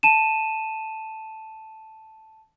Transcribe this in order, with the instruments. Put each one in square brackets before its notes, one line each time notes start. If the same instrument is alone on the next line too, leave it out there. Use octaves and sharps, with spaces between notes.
[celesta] A5 D#7 E7